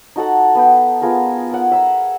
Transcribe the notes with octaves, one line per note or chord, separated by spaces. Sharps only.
D#4 F#4 A4 F#5
B3 B4 G5
B3 F4 G#4 A#4
A#4 F#5
E5 A#5 E6